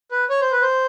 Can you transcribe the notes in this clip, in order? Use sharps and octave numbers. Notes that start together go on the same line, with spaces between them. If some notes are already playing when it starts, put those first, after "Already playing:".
B4
C#5
C5
B4
C5